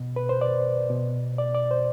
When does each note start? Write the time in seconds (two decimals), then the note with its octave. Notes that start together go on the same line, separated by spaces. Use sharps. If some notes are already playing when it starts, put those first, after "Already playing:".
Already playing: B2
0.16 B4
0.29 C5
0.41 D5
0.90 B2
1.38 D5
1.55 D5
1.71 C5